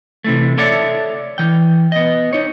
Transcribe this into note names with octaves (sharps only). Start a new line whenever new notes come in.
C3 E3 A3
A4 C#5 D5 E5 F#5 A5
E3 G5
B3 D#5
D#4 C#5